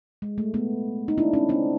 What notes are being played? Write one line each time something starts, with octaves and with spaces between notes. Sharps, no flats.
G#3
A3
A3 B3
D#4
D4 E4
C#4 D#4
C4 D4